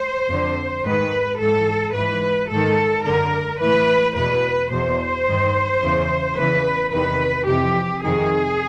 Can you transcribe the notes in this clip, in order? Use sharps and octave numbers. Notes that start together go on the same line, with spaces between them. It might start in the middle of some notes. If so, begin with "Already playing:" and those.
Already playing: C5
F2 D3
G#2 D#3 B4
G#2 E3 A4
G#2 E3 B4
G#2 D#3 A4
F#2 D3 A#4
A2 E3 B4
E2 B2 B4
E2 B2 C5
G2 D#3
E2 C#3 E3
E2 C#3 E3 B4
E2 C3 D#3 B4
F2 C3 E3 G4
F2 C3 D#3 G#4